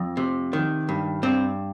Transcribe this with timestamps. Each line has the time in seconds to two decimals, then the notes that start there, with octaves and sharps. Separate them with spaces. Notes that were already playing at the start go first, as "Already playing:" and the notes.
Already playing: F2
0.17 C3
0.53 D#3
0.89 G2
1.23 G2 C4